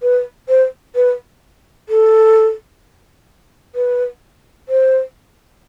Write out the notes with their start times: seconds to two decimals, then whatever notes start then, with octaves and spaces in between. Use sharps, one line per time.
0.02 B4
0.49 C5
0.96 B4
1.89 A4
3.75 B4
4.69 C5